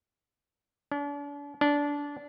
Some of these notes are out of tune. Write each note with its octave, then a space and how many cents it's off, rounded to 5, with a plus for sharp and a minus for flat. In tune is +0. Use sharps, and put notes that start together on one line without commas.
D4 -40
D4 -20